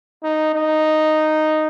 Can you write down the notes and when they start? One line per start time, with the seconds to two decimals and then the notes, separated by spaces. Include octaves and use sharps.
0.23 D#4
0.54 D#4